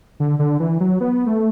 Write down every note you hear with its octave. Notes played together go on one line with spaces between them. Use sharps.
D3
D3
E3
F#3
B3
A3